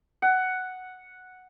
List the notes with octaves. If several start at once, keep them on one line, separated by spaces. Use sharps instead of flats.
F#5